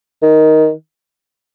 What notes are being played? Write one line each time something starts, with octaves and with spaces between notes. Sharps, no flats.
D#3